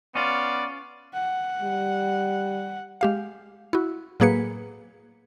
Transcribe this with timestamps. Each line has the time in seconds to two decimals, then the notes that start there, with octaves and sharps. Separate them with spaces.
0.15 B3 C#4 F4 D5
1.14 F#5
1.62 G3
3.01 G#3 G4 F5
3.73 E4 F#4
4.20 A2 F#3 A#3 G#4 B4 C#7